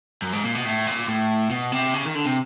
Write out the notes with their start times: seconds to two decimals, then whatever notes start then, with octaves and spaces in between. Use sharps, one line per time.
0.22 F#2
0.33 G#2
0.44 A#2
0.55 B2
0.65 A2
0.87 A#2
1.08 A2
1.50 B2
1.72 C3
1.94 C#3
2.05 D#3
2.15 D3
2.26 C3